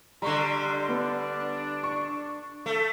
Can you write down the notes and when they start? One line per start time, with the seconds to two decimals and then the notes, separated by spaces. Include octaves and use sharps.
0.22 D3 G3 D#5 A#5 C6 C#6
0.89 B3 D4
1.84 C#6
2.66 A3 A4